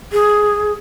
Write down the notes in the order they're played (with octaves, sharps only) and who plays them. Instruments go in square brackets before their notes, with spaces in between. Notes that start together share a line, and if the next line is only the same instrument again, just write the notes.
[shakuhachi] G#4